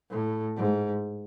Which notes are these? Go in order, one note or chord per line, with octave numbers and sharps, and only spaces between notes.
A2
G#2